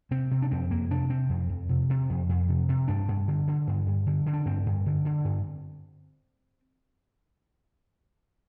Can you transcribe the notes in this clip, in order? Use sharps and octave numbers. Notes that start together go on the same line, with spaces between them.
C3 C4
C3
D4
F2 C4
F2 A#3
C3 D4
C3 C4
F2
F2
C3
C3
F2
F2
C3
C3
G2 D4
G2
D3
D3
G2
G2
D3
D3
D4
G2 C4
G2
D3
D3
G2